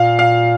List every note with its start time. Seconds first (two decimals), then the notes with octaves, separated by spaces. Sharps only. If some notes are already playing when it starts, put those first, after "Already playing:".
Already playing: A#2 F5
0.19 F5